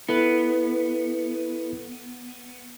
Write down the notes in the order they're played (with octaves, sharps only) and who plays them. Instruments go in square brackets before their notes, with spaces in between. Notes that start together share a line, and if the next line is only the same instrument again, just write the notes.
[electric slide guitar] B3 [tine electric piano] E4 A4 B4